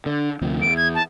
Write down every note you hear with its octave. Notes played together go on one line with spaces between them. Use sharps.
D3
D2 C3 F3
E2 D7
G#6
A5